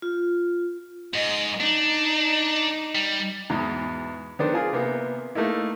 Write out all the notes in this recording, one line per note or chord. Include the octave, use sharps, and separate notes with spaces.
F4
G#2 D#5
D4 D#4
G3
E2 G#2 B2
D#3 B3 D4 C5
F4 G#4 A#4
C3 A#3 B3
A3 A#3 D#4 E4